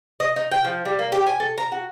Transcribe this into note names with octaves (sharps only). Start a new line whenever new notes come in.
D#5
D#4
G5
F3
G3
A#3
G4
G#5
A4
A#5
F#4